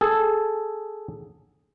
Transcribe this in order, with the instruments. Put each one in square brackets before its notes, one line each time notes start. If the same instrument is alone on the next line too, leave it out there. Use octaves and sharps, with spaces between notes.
[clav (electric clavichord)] G#4 A4